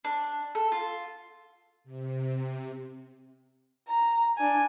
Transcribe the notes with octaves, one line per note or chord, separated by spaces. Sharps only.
D4
A4
F4
C3
A#5
D4 G#5